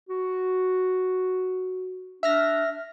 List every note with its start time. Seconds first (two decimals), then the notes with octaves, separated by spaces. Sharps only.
0.09 F#4
2.23 D4 E5 F6 A#6